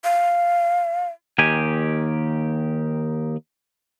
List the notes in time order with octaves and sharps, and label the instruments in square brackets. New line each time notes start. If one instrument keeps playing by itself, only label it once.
[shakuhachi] F5
[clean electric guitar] D#2 D#3 G4 G#5